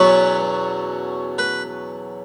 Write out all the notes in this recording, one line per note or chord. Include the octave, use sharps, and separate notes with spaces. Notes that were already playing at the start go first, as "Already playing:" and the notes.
Already playing: E2 B2 F#3 C#4 B4
B4